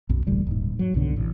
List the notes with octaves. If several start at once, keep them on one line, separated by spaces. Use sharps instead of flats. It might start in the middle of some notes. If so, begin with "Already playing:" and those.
B1 F#2
D#1 A1 D2 G3
D#1 G#2
F#3
C2 G#2 B2 D3
A1